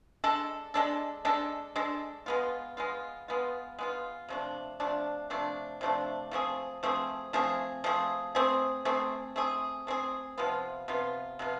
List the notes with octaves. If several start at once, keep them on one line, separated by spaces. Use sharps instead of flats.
G#3 D4 A4
G#3 D4 A4
G#3 D4 A4
G#3 D4 A4
G#3 B3 F4
G#3 B3 F4
G#3 B3 F4
G#3 B3 F4
C3 F3 A3 D4
C3 F3 A3 D4
C3 F3 A3 D4
C3 F3 A3 D4
F3 A3 C4 G#4
F3 A3 C4 G#4
F3 A3 C4 G#4
F3 A3 C4 G#4
A3 C4 G#4
A3 C4 G#4
A3 C4 G#4
A3 C4 G#4
C3 F3 B3 F4
C3 F3 B3 F4
C3 F3 B3 F4